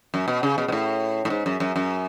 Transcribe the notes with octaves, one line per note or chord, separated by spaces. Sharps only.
F#2
B2
C#3
B2
B2
A2
A2
G#2
F#2
F#2
F#2